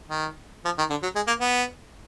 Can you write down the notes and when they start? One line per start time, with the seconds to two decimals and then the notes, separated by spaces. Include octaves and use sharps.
0.09 D#3
0.65 F3
0.78 D#3
0.90 D3
1.03 F#3
1.16 G#3
1.27 A#3
1.40 B3